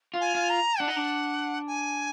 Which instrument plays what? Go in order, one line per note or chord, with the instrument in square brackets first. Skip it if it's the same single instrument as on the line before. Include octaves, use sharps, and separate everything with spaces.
[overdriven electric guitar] F4
[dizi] G#5
[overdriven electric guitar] F4
[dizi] A#5
[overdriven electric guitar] D4 [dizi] F#5
[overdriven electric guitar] D#4
D4
[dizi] G#5